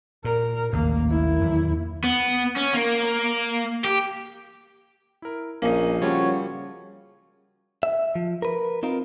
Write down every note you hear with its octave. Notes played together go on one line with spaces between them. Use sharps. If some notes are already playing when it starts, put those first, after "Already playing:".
A#2 A#4
A1 D#2 C#3 A#3
A#3 E4
E2 D#3 F#3
B3
C#4
A#3
G4
E4 A#4
A#1 A#3 C#4 D#4 D#5
C#3 F3 G3 F#4 G4 C#5
E5
F3
A#4 B4
C4 D#4 F4 A#4